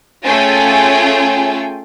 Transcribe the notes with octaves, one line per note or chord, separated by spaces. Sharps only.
A3 C#4 F4 G#4 G5 G#5